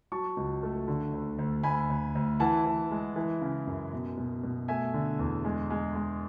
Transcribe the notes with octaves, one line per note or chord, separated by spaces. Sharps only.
F#3 A5 C#6
C#2
A3
D3
D2
D2
D2 G#5 B5
D2
D2
E3 F#5 A5
E3
G#3
E3
C#3
F#2
B2
B2
B2
A3 E5 G#5
D3
E2
G#3
G#3
G#3